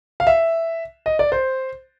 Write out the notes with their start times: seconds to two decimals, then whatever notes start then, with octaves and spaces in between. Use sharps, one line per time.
0.20 F5
0.27 E5
1.06 D#5
1.19 D5
1.32 C5